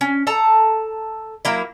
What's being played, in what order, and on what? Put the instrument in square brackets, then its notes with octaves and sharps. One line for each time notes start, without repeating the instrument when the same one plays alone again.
[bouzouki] C#4
A4 A5 A#5
F#3 A#3 E4